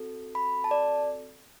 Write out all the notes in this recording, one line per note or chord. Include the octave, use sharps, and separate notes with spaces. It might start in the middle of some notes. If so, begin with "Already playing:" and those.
Already playing: C4 F#4 A4
B5
A5
D5